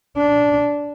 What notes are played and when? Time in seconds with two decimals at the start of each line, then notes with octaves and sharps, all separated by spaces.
0.17 D4